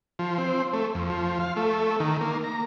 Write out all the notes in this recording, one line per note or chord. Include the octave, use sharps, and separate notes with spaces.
F3
C4
A3
F2
F3
F5
A3
D#3
A#3
A#5